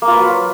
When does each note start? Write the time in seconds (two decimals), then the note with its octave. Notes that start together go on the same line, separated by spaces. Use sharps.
0.02 A#3
0.08 F4
0.13 B4
0.19 F#3